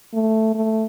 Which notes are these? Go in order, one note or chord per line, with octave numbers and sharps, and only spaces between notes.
A3
A3